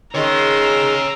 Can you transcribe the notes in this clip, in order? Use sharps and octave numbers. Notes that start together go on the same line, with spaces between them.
D#3 G#3 G#4 C#5 A#5 C6 E6